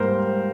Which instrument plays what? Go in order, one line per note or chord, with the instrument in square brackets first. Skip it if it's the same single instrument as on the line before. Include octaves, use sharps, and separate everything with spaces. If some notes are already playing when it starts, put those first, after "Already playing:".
Already playing: [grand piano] G#2 G3 A#3 A#4 C5